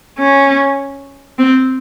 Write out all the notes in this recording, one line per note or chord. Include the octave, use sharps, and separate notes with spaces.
C#4
C4